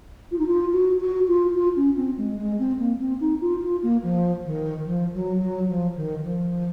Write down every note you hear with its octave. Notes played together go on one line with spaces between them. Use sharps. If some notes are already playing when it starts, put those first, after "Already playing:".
F4
D#4
F4
F#4
F#4
F4
F4
C#4
C4
G#3
G#3
C4
A#3
C4
D#4
F4
F4
A#3
F3
D#3
F3
F#3
F#3
F3
D#3
F3